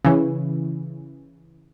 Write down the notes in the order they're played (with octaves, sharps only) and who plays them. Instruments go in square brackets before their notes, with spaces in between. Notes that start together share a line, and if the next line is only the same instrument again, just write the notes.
[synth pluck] C#3 E3